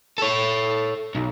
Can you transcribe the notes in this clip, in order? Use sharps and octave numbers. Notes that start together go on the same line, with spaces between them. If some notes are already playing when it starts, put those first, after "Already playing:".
A4 C#5
B1